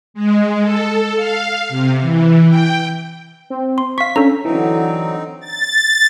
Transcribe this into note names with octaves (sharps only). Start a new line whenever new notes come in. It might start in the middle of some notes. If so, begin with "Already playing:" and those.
G#3
A4
F5
C3
E3
G5
C4
C6
F5 C#6 B6
C#4 D4 A4 A#5
D3 E3 F#3 C4 D#4
A6